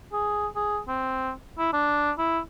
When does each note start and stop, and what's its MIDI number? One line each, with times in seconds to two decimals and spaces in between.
0.13 0.47 68
0.56 0.79 68
0.88 1.32 60
1.59 1.69 64
1.73 2.11 62
2.18 2.39 64